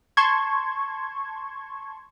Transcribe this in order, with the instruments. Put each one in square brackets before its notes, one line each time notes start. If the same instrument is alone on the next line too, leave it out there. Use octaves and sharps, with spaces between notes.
[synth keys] A5 C6 C#6 G#6